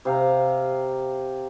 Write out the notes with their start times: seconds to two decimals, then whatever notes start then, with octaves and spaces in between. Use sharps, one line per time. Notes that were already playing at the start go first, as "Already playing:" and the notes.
0.05 C3 F5 A#5